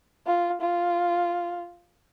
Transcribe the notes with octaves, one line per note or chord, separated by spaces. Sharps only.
F4
F4